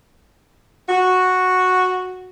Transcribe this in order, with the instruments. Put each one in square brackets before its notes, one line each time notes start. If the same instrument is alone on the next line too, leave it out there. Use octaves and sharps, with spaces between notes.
[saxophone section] F#4